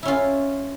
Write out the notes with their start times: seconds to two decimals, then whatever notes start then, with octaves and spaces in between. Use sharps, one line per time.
0.03 E4
0.05 C#4
0.08 F4